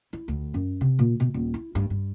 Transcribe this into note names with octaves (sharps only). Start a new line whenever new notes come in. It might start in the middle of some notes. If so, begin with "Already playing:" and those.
E4
D2
F#2
C3
A#2
B2
D#1
E4
G2
G2